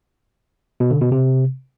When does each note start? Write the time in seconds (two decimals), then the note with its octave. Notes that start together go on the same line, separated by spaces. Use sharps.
0.80 B2
0.91 D3
1.01 B2
1.12 C3